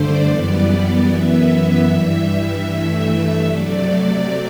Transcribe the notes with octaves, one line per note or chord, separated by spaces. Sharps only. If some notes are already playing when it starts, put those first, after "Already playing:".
Already playing: G2 D3 A3 C5 D5
F#2 E3 G3 B3
F#2 E3 B3 E5
G2 E3 G3
G2 E3 A3
C3 F#3 A3 D5